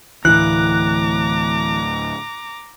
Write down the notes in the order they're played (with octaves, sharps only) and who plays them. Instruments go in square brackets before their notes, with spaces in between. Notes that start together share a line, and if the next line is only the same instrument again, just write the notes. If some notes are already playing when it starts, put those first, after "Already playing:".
[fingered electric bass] D2 A2 [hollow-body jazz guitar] E3 [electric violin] A#5 D6 [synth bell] F#6